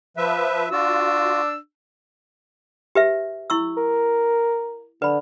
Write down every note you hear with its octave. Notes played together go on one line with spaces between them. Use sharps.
F3 B4 E5
D4 F4 F#4 E6
G4 B4 E5
E4 C#6 E6
A#4
D3 B4 B5